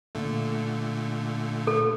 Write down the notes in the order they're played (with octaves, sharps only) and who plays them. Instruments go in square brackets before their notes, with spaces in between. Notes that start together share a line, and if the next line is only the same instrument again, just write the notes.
[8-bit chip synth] A#2 D3 A3
[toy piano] A4